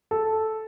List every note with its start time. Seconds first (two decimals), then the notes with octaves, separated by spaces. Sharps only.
0.11 A4